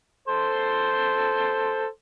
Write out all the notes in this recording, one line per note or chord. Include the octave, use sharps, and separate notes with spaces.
A4 C5 C6